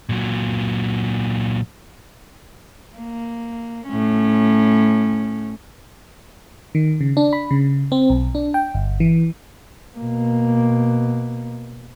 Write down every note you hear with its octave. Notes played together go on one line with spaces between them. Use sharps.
A#2 F#3
A#3
A2 C#4
D#3
C#3
D4
B5
C#3
C4
B1
D4
G5
G1
E3
B2 A#3